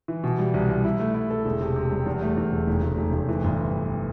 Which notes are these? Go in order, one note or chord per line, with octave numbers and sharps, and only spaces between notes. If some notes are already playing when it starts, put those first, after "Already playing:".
E3
B2
G3
C2
C2
E4
A3
E4
A4
E1
C3
C3
G3
E2
A3
E2
E1
F1
F1
F1
F1
E3
G1